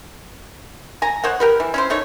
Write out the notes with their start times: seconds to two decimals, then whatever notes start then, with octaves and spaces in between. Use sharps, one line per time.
1.02 G#5 A#5
1.24 C5 C#5 D#5 F#5
1.40 G4 A#4 B4
1.60 E3
1.74 C#4 E4 C5
1.90 A3 D#4 C#5